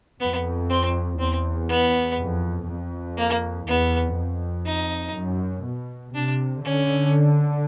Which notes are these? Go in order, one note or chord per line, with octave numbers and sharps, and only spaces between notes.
F2 B3
C4
E2 C4
B3
F2
F2
A#3
E2 B3
F2
D#4
F#2
B2
C3 D4
D3 C#4